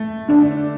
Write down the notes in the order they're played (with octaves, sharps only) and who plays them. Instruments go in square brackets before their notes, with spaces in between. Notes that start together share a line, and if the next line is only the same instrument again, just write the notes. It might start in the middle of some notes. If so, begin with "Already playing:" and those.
Already playing: [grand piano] A3
[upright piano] D3 D4